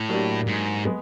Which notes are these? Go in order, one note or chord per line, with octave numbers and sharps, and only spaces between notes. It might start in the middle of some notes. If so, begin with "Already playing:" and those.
Already playing: A2
F#3 A#3 D4 G4
G#2
G#3 B3